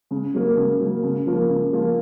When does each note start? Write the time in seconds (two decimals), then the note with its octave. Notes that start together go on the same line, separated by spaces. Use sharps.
0.11 C#3
0.34 F#3 A#3
0.57 C#3
0.80 F#3 A#3
1.03 C#3
1.26 F3 A#3 F4
1.49 C#3
1.72 F3 A#3 F4